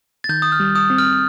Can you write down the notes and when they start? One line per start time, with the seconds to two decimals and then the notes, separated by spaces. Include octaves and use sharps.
0.24 A6
0.29 D#3 G6
0.42 D#6
0.52 F6
0.60 G3
0.75 D#6
0.90 C4
0.98 F6